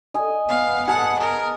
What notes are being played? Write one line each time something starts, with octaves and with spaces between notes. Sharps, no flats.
D#5 G#5
B3 F5
G#4 F#5 A5
A#4